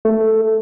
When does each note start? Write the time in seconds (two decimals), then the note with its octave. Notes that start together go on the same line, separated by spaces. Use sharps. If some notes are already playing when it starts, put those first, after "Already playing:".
0.05 A3